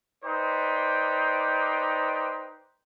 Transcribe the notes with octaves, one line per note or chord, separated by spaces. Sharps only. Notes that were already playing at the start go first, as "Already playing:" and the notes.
D#4 B4 C5 D5 G5